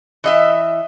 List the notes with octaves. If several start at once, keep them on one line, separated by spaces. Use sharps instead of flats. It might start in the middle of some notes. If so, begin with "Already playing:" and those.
E3 D#5 E5